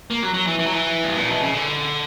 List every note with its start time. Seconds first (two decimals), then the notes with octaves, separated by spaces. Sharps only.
0.11 A#3
0.23 F#3
0.34 F#3
0.47 E3
0.59 E3
0.66 F#3
0.74 E3
1.04 G2
1.16 A#2
1.28 B2
1.41 C#3
1.54 D3